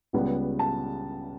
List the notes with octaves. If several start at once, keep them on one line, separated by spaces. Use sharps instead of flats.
C#2 C#3 G3 B3
A5